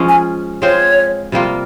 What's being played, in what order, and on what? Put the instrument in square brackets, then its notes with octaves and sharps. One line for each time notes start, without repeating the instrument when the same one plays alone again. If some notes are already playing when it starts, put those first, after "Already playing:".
Already playing: [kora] F3 G#3 C#4 F4
[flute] G#5
[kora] G#3 C4 F4 C5 [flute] C#5
[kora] C3 G3 A#3 F4